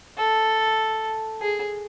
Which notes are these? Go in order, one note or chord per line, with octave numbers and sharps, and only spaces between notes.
A4
G#4